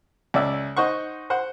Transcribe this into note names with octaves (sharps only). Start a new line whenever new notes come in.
C#2 D5 E5
D#4 C5 F#5 C#6
C5 F#5